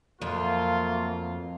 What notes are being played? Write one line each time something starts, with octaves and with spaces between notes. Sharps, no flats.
F2 F#3 A3 A#3 F4